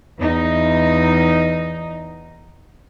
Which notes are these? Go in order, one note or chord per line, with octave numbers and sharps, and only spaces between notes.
E2 D#4